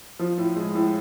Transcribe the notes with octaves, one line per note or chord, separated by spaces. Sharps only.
F3
A2
G#3
A2